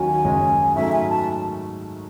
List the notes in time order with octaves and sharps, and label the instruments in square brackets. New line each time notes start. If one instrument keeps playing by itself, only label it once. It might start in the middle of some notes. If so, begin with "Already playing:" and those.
Already playing: [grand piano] D#2 D#3 F#3 C#4 F#4 [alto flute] G#5
[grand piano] F#1 F#2 C#3 G#3 C#4
[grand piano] G#2 F#3 A3 C#4 [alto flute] E5
[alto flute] G#5
A5